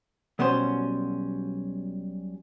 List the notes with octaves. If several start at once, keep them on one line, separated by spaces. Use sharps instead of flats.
B1 B2 G3 C#4 C5